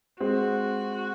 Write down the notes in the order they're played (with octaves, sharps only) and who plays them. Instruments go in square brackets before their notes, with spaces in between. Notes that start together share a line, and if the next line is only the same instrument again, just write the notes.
[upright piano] G#3 C4 [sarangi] F#4